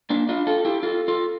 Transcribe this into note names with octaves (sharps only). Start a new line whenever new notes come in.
A#3 D4
D4 F4
F4 A4
E4 G4
F4 A4
F4 A4